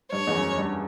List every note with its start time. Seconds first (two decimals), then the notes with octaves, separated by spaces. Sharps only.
0.12 G2 C#5
0.27 E2
0.35 F#2
0.58 G2